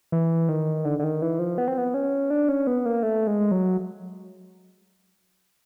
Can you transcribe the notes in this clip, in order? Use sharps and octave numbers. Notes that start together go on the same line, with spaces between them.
E3
D#3
D3
D3
D#3
E3
F3
B3
C4
B3
C#4
D4
C#4
B3
A#3
A3
G#3
F#3